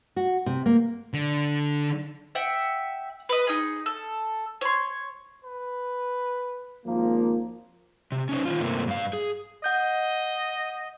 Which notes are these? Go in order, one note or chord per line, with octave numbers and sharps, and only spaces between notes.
F#4
C3
A#3
D3
E5 F#5 G5
B4 D#5
D#4 G#4
A4
C#5 C6
B4
G#1 F3 A#3
C3
C#4 D#4 C5
D#3 F3 F4
G2 C3 A3 A#3 C4
G2 F5
G#4
D#5 F#5 G6